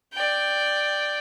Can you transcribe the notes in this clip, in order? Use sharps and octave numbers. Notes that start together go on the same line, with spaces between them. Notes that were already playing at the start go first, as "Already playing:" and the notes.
D5 G5